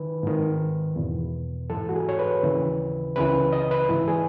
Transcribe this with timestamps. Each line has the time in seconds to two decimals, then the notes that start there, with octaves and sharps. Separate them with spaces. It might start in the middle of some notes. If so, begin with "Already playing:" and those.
Already playing: D#3 B4
0.23 G#2 D#3
0.96 E2 B2
1.70 G#2 E3 A4
1.89 F#4
1.94 G#4
2.09 C#5
2.19 B4
2.43 D#2 C#3 E3
3.16 C#2 C#3 E3 B4
3.53 D#5
3.71 B4
3.89 G#2 E3
4.07 G#4